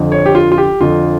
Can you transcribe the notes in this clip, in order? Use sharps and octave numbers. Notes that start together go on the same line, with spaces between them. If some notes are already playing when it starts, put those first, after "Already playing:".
Already playing: F2 D3 F3
C#5
G4
F4
F4
G4
F2 D3 F3 F4